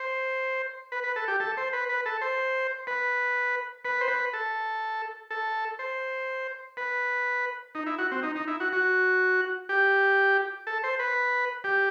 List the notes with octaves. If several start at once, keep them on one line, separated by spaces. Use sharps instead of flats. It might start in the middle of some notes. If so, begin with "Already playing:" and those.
Already playing: C5
B4
B4
A4
G4
A4
C5
B4
B4
A4
C5
B4
B4
C5
B4
A4
A4
C5
B4
D#4
E4
F#4
C4
D#4
D#4
E4
F#4
F#4
G4
A4
C5
B4
G4